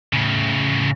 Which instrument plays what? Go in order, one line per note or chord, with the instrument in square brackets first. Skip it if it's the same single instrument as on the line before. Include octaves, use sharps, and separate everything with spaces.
[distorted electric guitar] A2 C#3